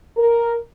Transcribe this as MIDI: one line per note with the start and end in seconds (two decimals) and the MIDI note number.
0.17 0.55 70